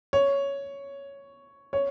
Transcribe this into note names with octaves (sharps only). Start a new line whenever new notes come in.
C#5
C#5